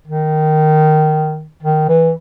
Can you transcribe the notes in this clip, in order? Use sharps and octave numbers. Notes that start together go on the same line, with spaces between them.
D#3
D#3
E3